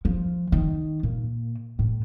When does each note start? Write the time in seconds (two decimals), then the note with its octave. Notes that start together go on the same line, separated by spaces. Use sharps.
0.05 F3
0.52 D#3
1.03 A#2
1.79 A2